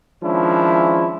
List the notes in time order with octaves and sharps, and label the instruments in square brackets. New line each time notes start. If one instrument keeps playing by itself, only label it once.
[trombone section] D#3 F3 G#3 C#4 D4 E4